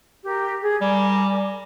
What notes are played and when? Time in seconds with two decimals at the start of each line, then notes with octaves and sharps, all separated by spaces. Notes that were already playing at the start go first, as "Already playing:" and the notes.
0.23 G4 A#4
0.62 G#4
0.81 G3 A#4 G#5 D6